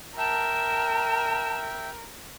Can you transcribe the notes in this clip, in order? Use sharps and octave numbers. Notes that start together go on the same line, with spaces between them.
A#4 E5 G5 A5